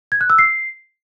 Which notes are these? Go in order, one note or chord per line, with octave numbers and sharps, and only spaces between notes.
G#6
F#6
E6
C7